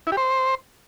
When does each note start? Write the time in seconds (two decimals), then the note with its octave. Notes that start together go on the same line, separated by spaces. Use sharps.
0.07 E4
0.12 G4
0.17 C5